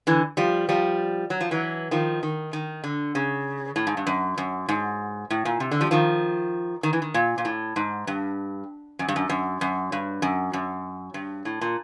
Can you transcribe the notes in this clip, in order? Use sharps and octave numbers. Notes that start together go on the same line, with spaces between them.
D3 E3
F3 G3
F3 G3
F#3
F3
E3 F#3
D#3 F3
D#3
D#3
D3
C#3
A2
G#2
G2
F#2
F#2
G#2
A2
A#2
C3
D3
F3 G3
D#3 F3
D#3
E3
D#3
A#2
A#2
A2
G#2
G2
F#2
G2
F#2
F#2
F#2
G2
F#2
F#2
G2
A2
A#2